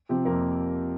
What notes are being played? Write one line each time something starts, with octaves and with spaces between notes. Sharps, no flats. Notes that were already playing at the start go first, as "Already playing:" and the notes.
C3 F3 C4 G4
F2 A#3 A#4